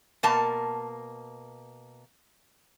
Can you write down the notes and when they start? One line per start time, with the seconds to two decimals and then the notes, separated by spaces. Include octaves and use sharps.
0.23 B2 A#3 A5